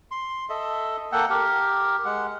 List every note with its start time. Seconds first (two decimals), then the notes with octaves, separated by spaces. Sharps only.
0.11 C6
0.50 A4 D#5 E5
1.12 A#3 A4 F#5 G5
1.30 G4 A#4
2.05 G#3 F#5